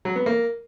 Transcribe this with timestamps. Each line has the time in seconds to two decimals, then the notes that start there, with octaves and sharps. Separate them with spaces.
0.05 F#3
0.16 B3
0.26 A#3